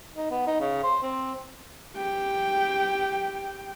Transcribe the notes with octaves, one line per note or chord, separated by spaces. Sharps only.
D#4
B3
D#4
C#3
C5
C4
G4 G5